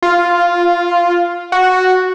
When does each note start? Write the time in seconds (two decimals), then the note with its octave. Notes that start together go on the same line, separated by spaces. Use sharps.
0.02 F4
1.52 F#4